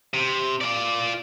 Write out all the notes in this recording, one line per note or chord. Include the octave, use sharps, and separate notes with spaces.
C3
F4 D5